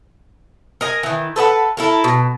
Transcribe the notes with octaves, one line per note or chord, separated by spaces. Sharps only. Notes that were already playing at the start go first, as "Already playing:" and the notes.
A#4 D#5 G5 G#5
D#3 E3
A4 B4 D#5 F#5
E4 A4 A#4
B2